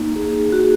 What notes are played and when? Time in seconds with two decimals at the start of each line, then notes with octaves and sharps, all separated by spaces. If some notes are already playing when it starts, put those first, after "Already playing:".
Already playing: A#3 D#4
0.16 G#4
0.52 F#4
0.60 G#4